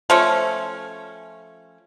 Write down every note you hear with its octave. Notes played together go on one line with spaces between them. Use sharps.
F3 A3 C#4